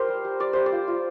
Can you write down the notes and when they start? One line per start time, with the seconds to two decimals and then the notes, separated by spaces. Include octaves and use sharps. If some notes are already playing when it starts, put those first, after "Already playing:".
Already playing: G4 A#4 C5
0.08 G3
0.25 G3
0.40 G3 D5
0.53 G3 C5
0.66 D5
0.72 F4
0.88 F4